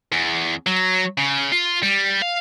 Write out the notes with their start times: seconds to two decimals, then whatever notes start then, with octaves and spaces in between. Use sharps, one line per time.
0.12 E2
0.66 F#3
1.18 C#3
1.52 F4
1.83 G3
2.22 F5